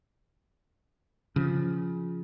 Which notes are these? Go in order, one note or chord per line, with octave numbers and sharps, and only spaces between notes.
C#3 F3